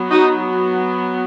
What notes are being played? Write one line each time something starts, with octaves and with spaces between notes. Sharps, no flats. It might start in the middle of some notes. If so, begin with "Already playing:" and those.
Already playing: F#3 B3
D#4 F#4